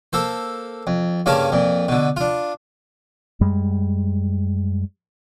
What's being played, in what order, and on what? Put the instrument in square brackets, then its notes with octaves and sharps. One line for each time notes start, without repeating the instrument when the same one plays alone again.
[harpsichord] A#3 A4 C5
F2
G2 C#3 A#3 C#4 F5 A5
F2 A#2
B2 D3
D4 F4
[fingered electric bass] F#2 G3 G#3